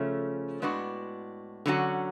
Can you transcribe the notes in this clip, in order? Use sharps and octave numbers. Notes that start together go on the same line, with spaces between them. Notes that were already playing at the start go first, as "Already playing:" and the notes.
Already playing: C#3 F3 A3 C#4
A2 G#3 B3 D4 F#4
D3 F#3 C#4 F#4